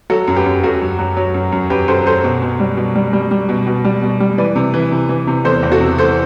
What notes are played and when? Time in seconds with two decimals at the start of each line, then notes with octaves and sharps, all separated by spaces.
0.10 F#3 F#4 A4
0.28 F#2
0.36 G4 B4
0.46 F#2
0.63 F#2 F#4 A4
0.81 F#2
0.99 F#3
1.17 F#3
1.34 F#2
1.52 F#2
1.70 F#2 G4 B4
1.88 F#2 A4 C5
2.06 F#3 A4 C5
2.24 B2
2.42 B2
2.60 G3
2.77 B2
2.95 G3
3.13 G3
3.31 G3
3.49 B2
3.66 B2
3.85 G3
4.02 B2
4.20 G3
4.38 E3 B4 D5
4.56 C3
4.74 E3
4.91 C3
5.09 E3
5.27 C3
5.44 E2 A4 C5
5.63 E2
5.72 F#4 A4
5.80 C3
5.98 E3 A4 C5